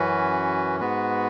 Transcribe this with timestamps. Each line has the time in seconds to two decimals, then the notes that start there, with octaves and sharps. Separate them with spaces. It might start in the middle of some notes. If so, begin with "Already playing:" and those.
Already playing: F#2 E3 C#4 F#4 B4
0.80 G#2 G#3 B3 F#4 B4